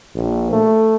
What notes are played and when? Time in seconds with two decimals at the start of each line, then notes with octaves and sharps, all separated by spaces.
0.15 A#1
0.52 A3